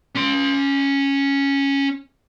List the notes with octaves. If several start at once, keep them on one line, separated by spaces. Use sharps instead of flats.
C#4 C6